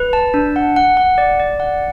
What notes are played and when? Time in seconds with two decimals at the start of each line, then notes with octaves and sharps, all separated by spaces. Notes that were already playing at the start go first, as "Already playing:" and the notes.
Already playing: B4
0.13 A5
0.34 D4
0.56 F#5
0.76 F#5
0.97 F#5
1.18 D5
1.39 D5
1.60 F#5